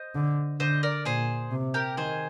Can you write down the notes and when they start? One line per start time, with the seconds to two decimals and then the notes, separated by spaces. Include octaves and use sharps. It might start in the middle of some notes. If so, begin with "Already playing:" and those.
Already playing: C5 D#5
0.15 D3
0.60 D3 C5 D#5
0.83 A#4 D5
1.05 A#2 G#4 C5
1.51 C3
1.74 G4 A#4
1.97 D#3 G#4 C5